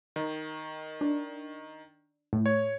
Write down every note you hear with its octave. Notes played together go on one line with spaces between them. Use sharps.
D#3
D4
A2
C#5